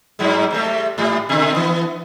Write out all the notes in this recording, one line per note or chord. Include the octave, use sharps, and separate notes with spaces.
G2 F#3 G#3
C3 G3 A3
G#2 G3
B2 D3
E3 B3